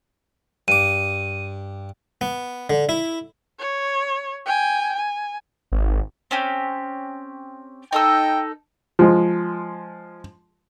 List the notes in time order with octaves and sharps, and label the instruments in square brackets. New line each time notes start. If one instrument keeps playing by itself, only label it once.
[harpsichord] G2 D6 [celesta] D#7
[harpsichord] B3
D3
E4
[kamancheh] C#5
G5 G#5
G#5
[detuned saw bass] G#1
[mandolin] C4 C#4 G4
[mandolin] D#4 A4 E6 [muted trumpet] G5
[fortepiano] F3 G#3